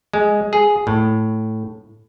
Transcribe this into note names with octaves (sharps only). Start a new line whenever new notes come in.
G#3
G#4
A2